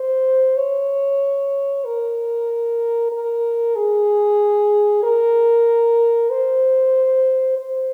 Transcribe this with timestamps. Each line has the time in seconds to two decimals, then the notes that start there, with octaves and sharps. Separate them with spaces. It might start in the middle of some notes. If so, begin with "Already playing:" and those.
Already playing: C5
0.57 C#5
1.85 A#4
3.12 A#4
3.76 G#4
5.03 A#4
6.30 C5
7.57 C5